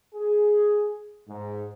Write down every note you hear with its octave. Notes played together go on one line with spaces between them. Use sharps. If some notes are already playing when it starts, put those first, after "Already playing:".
G#4
G#2